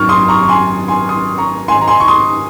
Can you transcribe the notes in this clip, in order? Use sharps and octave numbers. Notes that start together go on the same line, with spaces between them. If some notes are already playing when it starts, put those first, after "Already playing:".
Already playing: G#1 F#2 D#3 C#6 F6
C6 D#6
A#5 C#6
C#6
G#5 C6
G#5 C6
C6 D#6
A#5 C#6
G#2 D#3 G#3 C4 G#5 C6
A#5
G#5 C6
C#6
C6 D#6